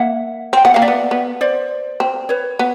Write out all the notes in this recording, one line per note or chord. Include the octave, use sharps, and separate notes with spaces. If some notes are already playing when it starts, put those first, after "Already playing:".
Already playing: A#3 E5 F#5
C4 G5
B3 F#5
A#3 F5
D5 E5
B3
B3
C5 D5
C4
B4 C#5
B3